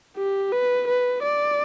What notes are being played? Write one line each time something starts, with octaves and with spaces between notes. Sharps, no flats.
G4
B4
B4
D5